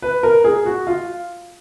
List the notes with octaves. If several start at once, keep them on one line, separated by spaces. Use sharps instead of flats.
B4
A#4
G#4
F#4
F4